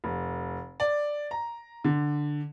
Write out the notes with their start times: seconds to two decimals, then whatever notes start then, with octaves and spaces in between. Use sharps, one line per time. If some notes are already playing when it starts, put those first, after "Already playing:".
0.04 F1
0.80 D5
1.31 A#5
1.84 D3